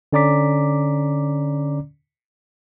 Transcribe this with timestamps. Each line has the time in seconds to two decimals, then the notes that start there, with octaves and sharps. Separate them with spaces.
0.13 D3 C#4 D5 A#5 D6 B6